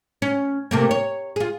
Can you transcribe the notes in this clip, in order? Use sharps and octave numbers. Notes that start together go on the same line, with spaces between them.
C#4
C3 A3 A#3
C#5
F4 G#4